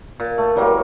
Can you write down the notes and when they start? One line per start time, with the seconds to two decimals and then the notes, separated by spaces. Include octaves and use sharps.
0.20 A#2
0.38 A3
0.56 E3 F#3 G3 A#3
0.67 C#5